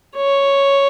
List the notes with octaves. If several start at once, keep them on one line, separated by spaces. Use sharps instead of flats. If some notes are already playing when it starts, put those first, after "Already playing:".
C#5